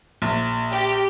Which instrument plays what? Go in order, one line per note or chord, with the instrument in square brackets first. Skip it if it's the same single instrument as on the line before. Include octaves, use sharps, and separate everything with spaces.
[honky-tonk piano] A#1
[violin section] G4